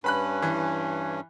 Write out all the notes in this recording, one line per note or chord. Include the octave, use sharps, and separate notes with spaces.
G2 C#4 B4 B5 F#6
E3